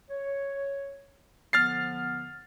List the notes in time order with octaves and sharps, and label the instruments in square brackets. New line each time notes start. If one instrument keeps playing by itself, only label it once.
[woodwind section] C#5
[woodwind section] D3 F3 B3 [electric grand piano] F6 A6 C7